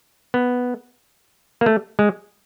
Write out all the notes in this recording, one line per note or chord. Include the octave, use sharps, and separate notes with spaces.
B3
A#3
A3
G#3